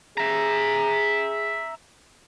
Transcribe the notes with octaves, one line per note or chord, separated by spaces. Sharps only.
G#4 E5 A#5